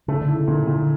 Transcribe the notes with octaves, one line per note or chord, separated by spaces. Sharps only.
C#3 A3
D3
E4
C#3
A#2 D3
A#2 C#3
D3